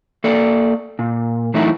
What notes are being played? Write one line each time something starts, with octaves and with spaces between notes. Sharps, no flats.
A#3 A4 D5
A#2
E3 F#3 A3 D#4 E4 F#4